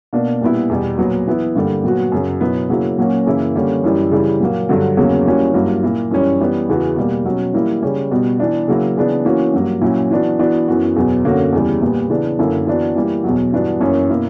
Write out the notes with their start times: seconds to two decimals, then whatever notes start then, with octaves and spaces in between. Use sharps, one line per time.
0.13 B2 A#3 D4
0.41 A#2 G3 B3 E4
0.69 E2 B2 G3
0.98 A#2 F#3 B3
1.27 E3 B3 E4
1.55 G2 D3 G3 A#3
1.83 A#2 F#3 B3 F#4
2.12 F#2 C#3 F#3
2.41 B2 F#3 B3 E4
2.70 C#3 F#3 A#3 E4
2.98 A#2 F#3 A#3 C#4 F#4
3.26 F#2 C#3 E3 A#3 E4
3.55 D3 G3 A#3 C#4
3.84 F#2 E3 G3
4.11 C#3 E3 G3
4.40 A#2 F#3 A#3
4.69 G2 D3 F#3
4.97 E2 C#3 F#3 A#3 C#4
5.26 E3 G3 A#3 C#4 F#4
5.54 G2 F#3 A#3 E4
5.83 A#2 A#3 E4
6.11 F#2 E3 G3 C#4
6.40 E3 G3 B3
6.69 E2 C#3 E3 B3 F#4
6.96 B2 G3 A#3
7.25 B2 F#3 C#4 F#4
7.54 E3 G3 A#3 E4
7.82 C#3 G3 C#4
8.11 B2 G3 B3 F#4
8.40 E3 B3 D4
8.68 C#3 F#3 A#3 E4
8.97 C#3 E3 B3 D4
9.25 E3 A#3 C#4 F#4
9.53 G2 F#3 A#3
9.81 A#2 F#3 C#4 E4
10.11 E3 B3 D4 F#4
10.39 E3 B3 D4 F#4
10.68 F#2 E3 B3 F#4
10.96 E2 B2 F#3 B3
11.24 F#2 D3 A#3 C#4 F#4
11.53 E2 C#3 E3 G3
11.82 A#2 G3 B3
12.10 C#3 E3 B3 D4
12.39 F#2 D3 A#3 E4
12.67 E3 B3 D4 F#4
12.96 E3 G3 A#3
13.24 E2 B2 F#3
13.52 G2 E3 B3 D4 F#4
13.81 F#2 E3 A#3 C#4
14.09 B2 A#3 E4